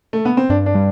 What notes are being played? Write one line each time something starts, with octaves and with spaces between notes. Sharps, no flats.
A3
B3
C4
G2 D4
D4
G3